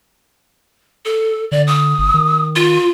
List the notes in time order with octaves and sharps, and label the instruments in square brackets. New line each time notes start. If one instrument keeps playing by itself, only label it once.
[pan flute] A4
[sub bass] D3 [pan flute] D5
[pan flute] D#6
[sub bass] G1
D#3
[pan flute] F4